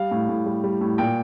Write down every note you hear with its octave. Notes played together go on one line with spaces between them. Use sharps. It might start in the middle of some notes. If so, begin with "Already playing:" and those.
Already playing: G3 F5
A2
A2
G3
G3
A2
A#2 G5